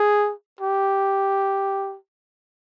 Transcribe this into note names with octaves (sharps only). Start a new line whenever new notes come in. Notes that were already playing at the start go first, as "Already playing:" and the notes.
Already playing: G#4
G4